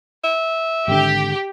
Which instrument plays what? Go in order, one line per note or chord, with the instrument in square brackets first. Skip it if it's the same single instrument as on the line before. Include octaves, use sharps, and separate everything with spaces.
[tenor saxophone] E5
[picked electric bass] G#1 D3 [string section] G4